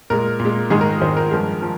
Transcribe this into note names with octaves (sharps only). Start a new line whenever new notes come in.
A#2 G#3 A#4
A#2
G#3
G#2 D#3 G#3 G#4
A#4
A#4
G#2 D#3 G#3 C5
A#4
G2 F3 G#3
F3